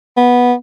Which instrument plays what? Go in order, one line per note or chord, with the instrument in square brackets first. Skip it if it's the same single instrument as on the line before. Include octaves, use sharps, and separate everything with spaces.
[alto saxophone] B3